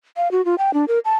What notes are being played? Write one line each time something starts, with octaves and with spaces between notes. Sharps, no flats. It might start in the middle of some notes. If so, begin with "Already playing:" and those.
F5
F#4
F4
G5
D4
A#4
A5